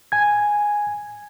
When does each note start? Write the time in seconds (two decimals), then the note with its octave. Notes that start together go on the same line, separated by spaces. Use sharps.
0.12 G#5 G#6